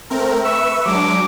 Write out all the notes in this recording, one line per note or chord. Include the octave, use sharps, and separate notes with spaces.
A3 C4 A#4
B4 E5 C#6 E6
F#3 G#3 D4 D6